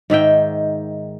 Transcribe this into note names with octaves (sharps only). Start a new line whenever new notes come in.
G#2 D#3 E5 G5